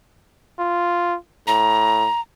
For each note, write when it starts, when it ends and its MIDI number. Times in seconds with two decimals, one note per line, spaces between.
0.59 1.15 65
1.47 2.07 45
1.47 2.20 82